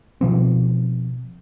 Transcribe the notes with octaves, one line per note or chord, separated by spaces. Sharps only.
B2 F3 C4